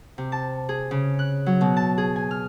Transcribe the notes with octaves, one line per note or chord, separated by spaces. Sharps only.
C3
A5
G#4
C#3
F#6
F#3
B2
A5
G#4
G#5
F6